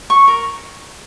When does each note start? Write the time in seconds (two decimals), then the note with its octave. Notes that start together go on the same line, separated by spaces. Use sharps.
0.10 C#6
0.28 A#4